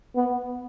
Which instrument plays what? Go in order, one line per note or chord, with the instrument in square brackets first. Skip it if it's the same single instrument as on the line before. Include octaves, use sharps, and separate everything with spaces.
[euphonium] B3